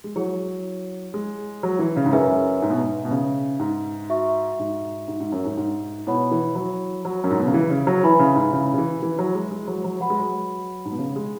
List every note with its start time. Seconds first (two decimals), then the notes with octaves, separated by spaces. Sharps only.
0.04 G#3
0.15 F#3 E4 G#4 C#5 F#5
1.14 G#3
1.63 F#3
1.79 E3
1.96 C#3
2.06 G#2
2.12 F#2 G#4 B4 E5 G#5
2.62 G#2
2.70 B2
2.78 G#2
3.05 B2
3.11 C#3
3.60 G#2
4.09 F#4 E5 C#6
4.59 G#2
5.08 G#2
5.20 G#2
5.32 F#2
5.46 G#2
5.57 G#2
6.07 B2 E4 C#5 F#5 B5
6.31 E3
6.55 F#3
7.05 F#3
7.24 F#2
7.30 G#2
7.39 B2
7.47 C#3
7.54 E3
7.70 C#3
7.87 F#3
8.03 E3 E4 B4 E5 G#5 B5
8.19 C#3
8.36 G#2
8.53 C#3
8.74 C#3
8.78 E3
9.03 E3
9.19 F#3
9.35 G#3
9.51 G#3
9.68 F#3
9.84 F#3
10.00 F#3 B4 F#5 B5
10.10 G#3
10.19 F#3
10.85 G#2
10.92 B2
10.99 C#3
11.16 G#3